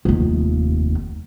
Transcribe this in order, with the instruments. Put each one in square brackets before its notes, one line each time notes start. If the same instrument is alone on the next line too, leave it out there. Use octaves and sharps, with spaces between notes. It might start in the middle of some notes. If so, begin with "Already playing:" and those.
[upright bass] F1 D#2